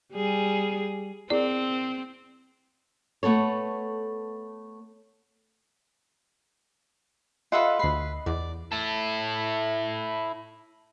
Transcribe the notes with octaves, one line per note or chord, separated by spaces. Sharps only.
G3 G#4
C4 E4 G#4 A#4 D5
A3 B3 A4 C#5
F4 A4 B4 D#5 E5 F#5
D2 B4 C7
E2 D5
E4 A4